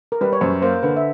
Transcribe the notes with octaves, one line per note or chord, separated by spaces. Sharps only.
A#4
G3 B4
C#5
F#2 C5
A#3 C5
D3 B4
E5